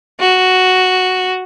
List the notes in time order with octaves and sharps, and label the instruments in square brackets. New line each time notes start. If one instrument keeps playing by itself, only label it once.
[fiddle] F#4